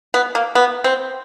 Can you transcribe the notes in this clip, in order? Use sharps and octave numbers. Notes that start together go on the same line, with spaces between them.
B3
A#3
B3
C4